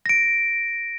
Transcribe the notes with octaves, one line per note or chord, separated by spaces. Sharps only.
A#6 D7